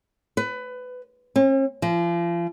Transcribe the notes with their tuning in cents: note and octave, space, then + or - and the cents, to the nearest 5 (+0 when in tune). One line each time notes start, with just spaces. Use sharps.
B4 +20
C#4 -45
F3 -35